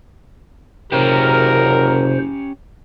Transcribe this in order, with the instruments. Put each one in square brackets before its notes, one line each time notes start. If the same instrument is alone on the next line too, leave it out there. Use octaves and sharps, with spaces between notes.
[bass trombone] F#1 [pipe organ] C3 C5 [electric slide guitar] C#4 G4 [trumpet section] A#4